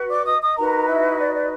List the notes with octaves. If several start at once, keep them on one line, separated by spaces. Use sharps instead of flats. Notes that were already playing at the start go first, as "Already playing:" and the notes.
Already playing: F#4 B4
D5 D6
D#5 D#6
D#5 D#6
D#4 F#4 A#4 B4 A#5
E4 E5
D5
D5